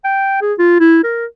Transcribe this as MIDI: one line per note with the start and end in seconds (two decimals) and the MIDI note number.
0.05 0.38 79
0.42 0.54 68
0.59 0.79 65
0.80 1.02 64
1.04 1.26 70